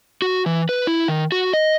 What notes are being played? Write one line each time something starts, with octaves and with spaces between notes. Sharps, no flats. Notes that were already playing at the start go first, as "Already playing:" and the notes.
F#4
E3
B4
E4
D#3
F#4
D#5